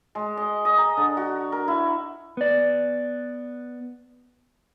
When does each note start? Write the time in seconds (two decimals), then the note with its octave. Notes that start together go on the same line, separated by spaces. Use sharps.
0.15 G#3
0.37 D#5
0.65 D#5
0.78 A#5
0.97 D3
1.17 F#4
1.52 A#4
1.68 E4
2.37 B3 D5